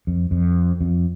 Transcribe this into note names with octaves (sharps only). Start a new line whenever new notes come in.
F2
F2
F2